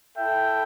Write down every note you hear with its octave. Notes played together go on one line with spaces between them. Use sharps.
E4 A4 E5 G5